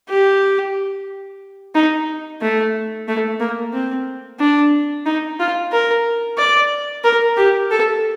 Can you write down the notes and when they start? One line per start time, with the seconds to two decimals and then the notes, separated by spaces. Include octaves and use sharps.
0.09 G4
1.75 D#4
2.41 A3
3.08 A3
3.40 A#3
3.73 C4
4.40 D4
5.06 D#4
5.40 F4
5.72 A#4
6.38 D5
7.04 A#4
7.37 G4
7.71 A4